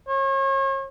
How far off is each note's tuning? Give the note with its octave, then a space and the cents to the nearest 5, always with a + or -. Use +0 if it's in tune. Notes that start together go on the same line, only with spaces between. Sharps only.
C#5 -40